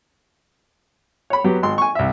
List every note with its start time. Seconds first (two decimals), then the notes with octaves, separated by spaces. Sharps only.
1.30 C#5 B5
1.44 F#3 B3 G4
1.63 G#1 C6
1.78 G#5 C#6
1.95 C2 E5